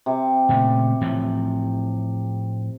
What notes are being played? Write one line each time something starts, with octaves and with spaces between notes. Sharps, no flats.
C3
A#2 C#3 A3
A2 E3 F3